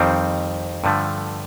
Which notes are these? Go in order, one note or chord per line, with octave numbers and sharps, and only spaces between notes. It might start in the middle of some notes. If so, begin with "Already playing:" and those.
Already playing: F2 D#3 G3 C4
G2 D3 F3 A3